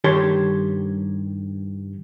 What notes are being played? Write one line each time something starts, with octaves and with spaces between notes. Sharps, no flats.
G2 D#3 G4 A4 C#5 C6